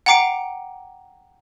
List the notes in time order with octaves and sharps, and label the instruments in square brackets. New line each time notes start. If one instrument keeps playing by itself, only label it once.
[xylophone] F#5 G5 A#5 D6 C7 D7